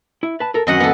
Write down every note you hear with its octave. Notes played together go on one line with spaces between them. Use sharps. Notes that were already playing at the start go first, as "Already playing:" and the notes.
E4
B4 A5
A4 A#4
F#2 D#3 F#3 C4 D#5 F#5
D2 E3 A#3 B3 A4